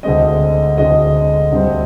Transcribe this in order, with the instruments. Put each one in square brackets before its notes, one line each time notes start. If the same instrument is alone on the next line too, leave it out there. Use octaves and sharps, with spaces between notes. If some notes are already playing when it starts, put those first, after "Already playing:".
[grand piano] D2 D3 G#3 C4 D#5
D2 D3 G#3 C4 D#5
D2 D3 G3 C4